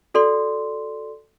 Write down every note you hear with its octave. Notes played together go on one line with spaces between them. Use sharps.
F#4 A4 D5 C6